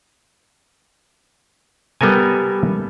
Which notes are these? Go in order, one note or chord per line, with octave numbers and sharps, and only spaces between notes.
G3 B3 A4 A#4 G#5